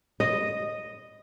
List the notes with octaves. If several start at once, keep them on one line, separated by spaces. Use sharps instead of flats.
D#5